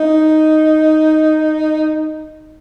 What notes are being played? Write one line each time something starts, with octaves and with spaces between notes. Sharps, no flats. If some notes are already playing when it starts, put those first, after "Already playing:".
Already playing: D#4